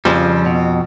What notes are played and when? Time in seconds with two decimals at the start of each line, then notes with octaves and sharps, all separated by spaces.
0.05 F2 C#3 F3 G3
0.46 B2